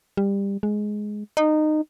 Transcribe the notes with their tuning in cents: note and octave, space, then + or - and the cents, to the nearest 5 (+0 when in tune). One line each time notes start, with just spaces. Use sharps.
G3 +20
G#3 +10
D#4 -20